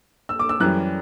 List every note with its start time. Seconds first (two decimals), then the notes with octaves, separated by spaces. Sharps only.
0.29 E6
0.39 D6
0.49 E6
0.60 F#2 E3 G3 C#4 F#6